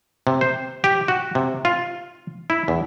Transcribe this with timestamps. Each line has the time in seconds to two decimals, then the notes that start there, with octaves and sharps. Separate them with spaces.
0.27 C3
0.41 C5
0.84 G4
1.08 F#4
1.35 C3
1.65 F4
2.50 E4
2.68 E2